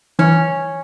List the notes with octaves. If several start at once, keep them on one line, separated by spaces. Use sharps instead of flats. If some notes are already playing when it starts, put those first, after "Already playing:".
E3 C#4